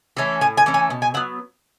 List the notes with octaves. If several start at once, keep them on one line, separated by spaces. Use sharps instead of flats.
E3 A3 C#4
A2 G#5
G#5
E3 A3 C#4
G#5
B2
G#5
F#3 B3 F#5